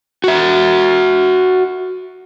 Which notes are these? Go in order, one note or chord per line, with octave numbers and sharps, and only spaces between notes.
F#4 E5